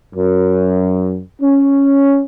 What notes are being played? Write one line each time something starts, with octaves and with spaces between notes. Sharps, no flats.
F#2
C#4